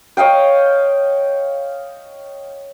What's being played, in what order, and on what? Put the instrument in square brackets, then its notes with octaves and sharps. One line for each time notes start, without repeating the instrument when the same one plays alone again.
[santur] C#5 D#5 F5 G5